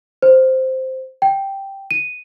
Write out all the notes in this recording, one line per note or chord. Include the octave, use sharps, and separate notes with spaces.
C5
G5
D#7